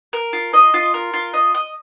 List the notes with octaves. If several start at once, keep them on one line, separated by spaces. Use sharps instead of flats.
A#4
F4
D#5
F4
A#4
F4
D#5
D#5